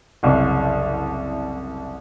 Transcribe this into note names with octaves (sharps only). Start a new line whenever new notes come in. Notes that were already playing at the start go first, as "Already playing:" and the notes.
F#1 C2